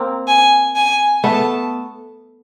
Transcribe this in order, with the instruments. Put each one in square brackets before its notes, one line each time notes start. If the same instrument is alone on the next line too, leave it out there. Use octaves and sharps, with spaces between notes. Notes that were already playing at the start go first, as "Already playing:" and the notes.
Already playing: [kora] A#3 C4
[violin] G#5
G#5
[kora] A3 B3 [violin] A5